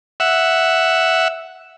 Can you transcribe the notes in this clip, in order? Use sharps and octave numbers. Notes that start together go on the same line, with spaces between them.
E5 F#5